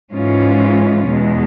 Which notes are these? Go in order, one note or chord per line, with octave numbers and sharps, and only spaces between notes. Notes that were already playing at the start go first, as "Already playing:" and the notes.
G#2 E3 G#3 C#4 F4
E2 B2 G#3